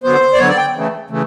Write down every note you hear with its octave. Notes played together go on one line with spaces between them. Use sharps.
D3 F#3 B3 C5
D5
D3 F#3 B3 C#5
D5
G5
C#3 E3 A3
C#3 E3 A3